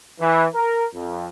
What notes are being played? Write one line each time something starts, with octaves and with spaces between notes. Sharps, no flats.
E3
A#4
F2